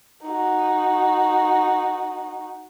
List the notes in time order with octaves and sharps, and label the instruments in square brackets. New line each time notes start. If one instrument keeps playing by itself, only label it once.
[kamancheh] D#4 F#4